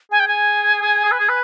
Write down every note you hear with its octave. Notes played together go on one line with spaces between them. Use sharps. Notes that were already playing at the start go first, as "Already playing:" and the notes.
G#4 G#5
G5
G#5
G#4
G#4
B4
G#4
B4